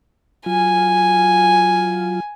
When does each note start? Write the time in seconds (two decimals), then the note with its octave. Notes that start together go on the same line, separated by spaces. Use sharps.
0.46 F#3 F4 G#5